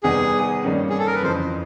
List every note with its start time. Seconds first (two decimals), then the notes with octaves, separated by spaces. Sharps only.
0.03 E2 C3 D#3 G3 B3 G#4
0.64 G2 D#3 G3 A#3 C#4
0.89 G#4
0.99 A4
1.07 A#4
1.14 B4
1.23 F2 C#3 E3 C5